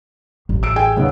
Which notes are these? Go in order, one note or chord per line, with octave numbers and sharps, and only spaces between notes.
A1
E6 D7
G#4 G5 G#5
D#2 C#3 B3